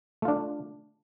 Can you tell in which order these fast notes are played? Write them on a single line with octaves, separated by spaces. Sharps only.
A3 F4 D4